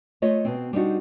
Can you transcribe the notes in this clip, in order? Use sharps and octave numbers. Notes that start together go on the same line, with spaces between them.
A3 F4 C#5 D#5
B2 C4
G3 C4 D4 D#4 F#4